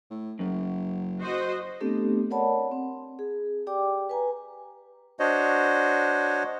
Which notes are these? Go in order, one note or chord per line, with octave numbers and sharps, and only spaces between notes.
A2
F#1 F#2
F#4 C5 D#5
A3 B3 C4 D4 G4 A4
A#4 C#5 D5 F#5 A5 B5
C4
G#4
G4 D5 G5 D6
B4 G#5 A#5
D4 F#4 C5 C#5 D#5